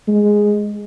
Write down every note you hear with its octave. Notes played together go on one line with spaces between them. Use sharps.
G#3